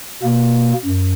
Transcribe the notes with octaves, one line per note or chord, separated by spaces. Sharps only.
B2 A#3
F#2